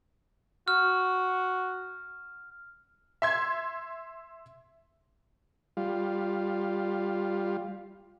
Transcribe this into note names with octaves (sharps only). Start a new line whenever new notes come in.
F#4 F6
E5 C6 G#6
G3 F4